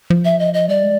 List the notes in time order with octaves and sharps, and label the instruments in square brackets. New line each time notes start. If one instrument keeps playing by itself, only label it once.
[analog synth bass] F3
[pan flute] E5
D#5
D#5
[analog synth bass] G3 [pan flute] D5
[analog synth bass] G#3